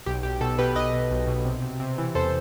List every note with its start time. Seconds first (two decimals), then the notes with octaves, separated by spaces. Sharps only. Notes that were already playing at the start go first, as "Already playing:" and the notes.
0.06 B1 G4
0.23 B1 G4
0.40 B2 A4
0.58 B2 G4 B4
0.75 B1 B4 D#5
0.93 B2
1.11 B1
1.27 B2
1.45 C3
1.62 C3
1.80 C3
1.98 E3
2.15 E2 A4 C5